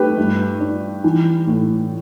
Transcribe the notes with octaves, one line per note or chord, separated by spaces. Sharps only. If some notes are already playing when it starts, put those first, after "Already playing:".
Already playing: A3 G4 B4
G2
D4
E3
A2